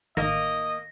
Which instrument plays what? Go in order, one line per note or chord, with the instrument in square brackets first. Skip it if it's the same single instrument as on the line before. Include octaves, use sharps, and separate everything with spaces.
[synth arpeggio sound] A1 D#3 [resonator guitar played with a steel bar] A#3 [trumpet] D#5 [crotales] A#6